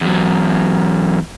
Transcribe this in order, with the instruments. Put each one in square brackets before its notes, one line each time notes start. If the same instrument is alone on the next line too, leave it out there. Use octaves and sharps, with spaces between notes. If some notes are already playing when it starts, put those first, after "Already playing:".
[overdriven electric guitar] E2 F#3